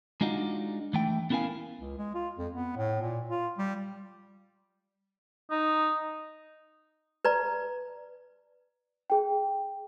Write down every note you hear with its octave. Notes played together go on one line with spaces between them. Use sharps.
G#3 D4 D#4 F4 F#4
E3 A3 G5
B3 C#4 E4 A#4 F5 G#5
C#2
G#3
F4
F2
B3
A2
A#2
F4
G3
D#4
B4 D5 A#5
G#4 G5